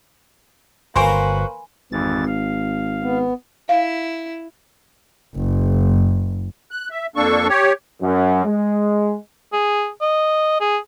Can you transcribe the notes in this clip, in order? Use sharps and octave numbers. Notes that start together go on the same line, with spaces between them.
G1 A#3 F#4 B4 C5 G#5 B5 C6
G#1 F2 E3 A6
F5
B3
E4 F5
F#1
F#6
E5
F2 A#3 D4 A4 C#6
G4 C#5
F#2
G#3
G#4
D#5
G#4